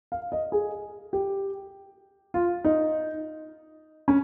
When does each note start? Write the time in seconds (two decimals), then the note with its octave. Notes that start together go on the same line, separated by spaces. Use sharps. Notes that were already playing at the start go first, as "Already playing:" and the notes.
0.12 F5
0.32 D#5
0.52 G#4
1.13 G4
2.34 F4
2.64 D#4
4.08 C#4